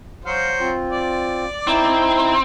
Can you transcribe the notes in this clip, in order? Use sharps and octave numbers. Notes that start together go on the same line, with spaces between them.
F#3 C5 F5
C4 F4
D5
C4 D#4 E4